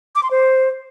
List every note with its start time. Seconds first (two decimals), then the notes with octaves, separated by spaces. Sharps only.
0.15 D6
0.23 C6
0.31 C5